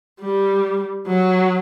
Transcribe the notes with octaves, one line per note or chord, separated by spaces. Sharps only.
G3
F#3